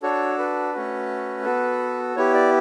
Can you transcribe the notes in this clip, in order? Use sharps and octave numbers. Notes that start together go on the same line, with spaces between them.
D4 F#4 A4 C#5
B4
A3 C#4 F#4
B3 F#4 A4
B3 E4 G4 C#5
D5